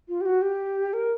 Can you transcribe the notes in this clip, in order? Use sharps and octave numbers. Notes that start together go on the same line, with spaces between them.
F4
G4
F#4
G4
A#4